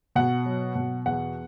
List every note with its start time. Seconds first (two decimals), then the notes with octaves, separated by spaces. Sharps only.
0.15 B2 F#5
0.45 F#3
0.75 B2
1.06 E2 F#5